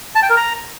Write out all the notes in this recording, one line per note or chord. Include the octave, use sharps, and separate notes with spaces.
A5
G5
A#4
A#5